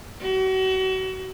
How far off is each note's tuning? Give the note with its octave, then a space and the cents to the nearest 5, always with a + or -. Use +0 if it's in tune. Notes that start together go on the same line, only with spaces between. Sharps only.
F#4 +35